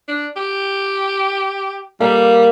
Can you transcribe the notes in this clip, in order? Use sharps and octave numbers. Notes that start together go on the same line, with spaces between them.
D4
G4
G3 A#3